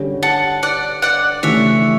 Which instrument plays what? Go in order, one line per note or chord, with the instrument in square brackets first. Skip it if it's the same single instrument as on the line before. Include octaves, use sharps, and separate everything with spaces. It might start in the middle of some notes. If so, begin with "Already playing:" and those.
Already playing: [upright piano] D3 G3 C#4
[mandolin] F#5 A5
D5 F#5
D5 F#5
[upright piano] C#3 E3 A3 D4 G4 [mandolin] C#5 E5